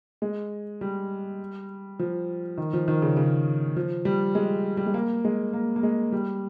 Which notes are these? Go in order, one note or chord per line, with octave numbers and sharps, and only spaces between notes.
G#3
G3
F3
D#3
F3
D#3
C#3
C#3
F3
G3
G#3
G3
G#3
A#3
G#3
A#3
A#3
G#3
G3